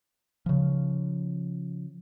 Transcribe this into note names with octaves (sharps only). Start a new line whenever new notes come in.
C#3 F3